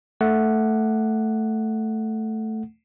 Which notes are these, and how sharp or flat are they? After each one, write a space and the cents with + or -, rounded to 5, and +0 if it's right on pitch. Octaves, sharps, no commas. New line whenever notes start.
A3 +0 F#5 +0